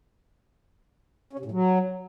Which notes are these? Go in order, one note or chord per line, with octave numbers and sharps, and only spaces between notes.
C#4
C3
A2
F#3